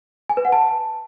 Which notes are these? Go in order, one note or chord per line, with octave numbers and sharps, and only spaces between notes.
G#5
B4
F#5
A5